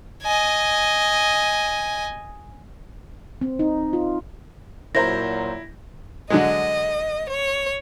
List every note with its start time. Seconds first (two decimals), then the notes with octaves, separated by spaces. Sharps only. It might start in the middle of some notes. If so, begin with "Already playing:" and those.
0.23 D#5 G#5
3.41 C4
3.59 D#4
3.93 F4
4.95 A#2 F#3 E4 A#4 C5 A#5 A#6
6.30 D3 F#3 G#3 D#5
7.29 C#5